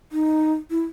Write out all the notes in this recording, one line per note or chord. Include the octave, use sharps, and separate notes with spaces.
D#4
E4